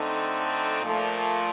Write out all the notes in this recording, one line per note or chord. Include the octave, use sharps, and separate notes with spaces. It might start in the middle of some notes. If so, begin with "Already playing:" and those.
Already playing: D3 A3 C4 D#4
A#2 F3 A3